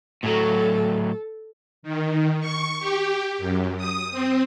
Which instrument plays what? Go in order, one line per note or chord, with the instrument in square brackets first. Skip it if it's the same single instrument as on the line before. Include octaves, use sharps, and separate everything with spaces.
[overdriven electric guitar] A2 F#3 [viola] A4
[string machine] D#3
C#6
G4
F#2
D#6
C4